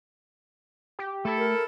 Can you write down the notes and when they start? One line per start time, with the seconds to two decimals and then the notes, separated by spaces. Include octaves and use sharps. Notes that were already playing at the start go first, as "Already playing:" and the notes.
0.99 G4
1.25 A3 E4 A4 E5
1.38 A#4